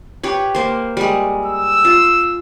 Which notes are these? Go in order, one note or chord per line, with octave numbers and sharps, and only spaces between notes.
G4 B4 C#5
A#3 C5
G3 G#3
E6
F4